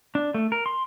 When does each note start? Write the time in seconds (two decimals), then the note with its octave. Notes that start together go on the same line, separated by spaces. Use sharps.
0.15 D4
0.34 A3
0.52 A#4
0.66 C6